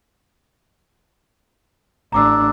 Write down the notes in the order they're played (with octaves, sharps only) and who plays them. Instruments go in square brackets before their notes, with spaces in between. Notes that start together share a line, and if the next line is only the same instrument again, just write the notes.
[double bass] A1 D4 [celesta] A#5 D6 E6